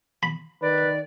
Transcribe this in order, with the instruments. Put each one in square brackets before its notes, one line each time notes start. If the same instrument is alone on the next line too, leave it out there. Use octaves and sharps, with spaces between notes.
[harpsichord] B5
[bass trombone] D#3 [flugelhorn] B4 [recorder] D5